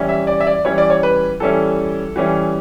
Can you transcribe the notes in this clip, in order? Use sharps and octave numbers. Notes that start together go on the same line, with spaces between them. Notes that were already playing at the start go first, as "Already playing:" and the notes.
Already playing: E3 G3 C#4 E4
E5
D5
E5
D5
E3 G3 C#4 E4 C#5
D5
C#5
B4
E3 G3 C#4 E4 A4
E3 G3 C#4 E4